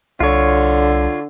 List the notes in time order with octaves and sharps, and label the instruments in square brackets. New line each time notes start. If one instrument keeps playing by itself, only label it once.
[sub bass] C2 [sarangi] D3 [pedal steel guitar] F4 C#5